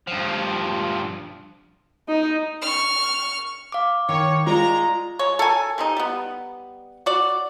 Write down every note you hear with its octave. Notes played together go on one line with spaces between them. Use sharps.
G2 F3
D#4
C#6 F6
F5 D6
D#3 C#5
G#3 F4 D5 A#5
G#3 C#5
A4 A#4 G#5
C3 C4 D#4
G3 B3
F#4 D5